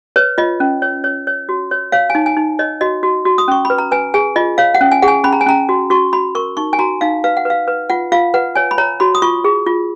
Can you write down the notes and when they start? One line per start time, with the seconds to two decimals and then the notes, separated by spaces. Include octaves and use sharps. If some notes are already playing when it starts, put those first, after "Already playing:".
0.16 B4 C#5
0.38 F4 D#5
0.60 C#4
0.82 C#5
1.04 C#5
1.27 C#5
1.49 F#4
1.71 C#5
1.92 C#5 F5
2.10 G#5
2.15 D#4
2.26 G#5
2.37 D#4
2.59 C#5 D#5
2.81 F#4 D#5
3.03 F#4
3.25 F#4
3.38 D#6
3.48 C#4 C#6
3.65 B5
3.70 B4
3.78 A#5
3.91 B4 G#5
4.14 G#4 G#5
4.36 F4 D#5
4.58 C#5 F5
4.74 F#5
4.81 C#4
4.92 G#5
5.02 G#4 F#5
5.08 G#5
5.24 C#4 B5
5.33 A#5
5.41 G#5
5.46 C#4 A#5
5.69 F#4
5.90 F#4 C#6
6.13 F#4 B5
6.35 A#4 C#6
6.57 D#4 C#6
6.73 G#5
6.79 F#4 A#5
7.01 D#4 F5
7.24 B4 F5
7.37 F#5
7.45 B4 F5
7.68 B4
7.89 F4 F#5
8.12 F4 F5
8.34 B4 F#5
8.55 C#5 G#5
8.71 B5
8.78 C#5 A#5
9.00 F#4 B5
9.15 D#6
9.22 F4 C#6
9.44 G#4
9.66 F4